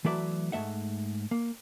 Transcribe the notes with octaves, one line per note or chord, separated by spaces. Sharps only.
E3 F#3 A3 B4 D5 E5
G#2 C#3 A3 E5 F#5
A#3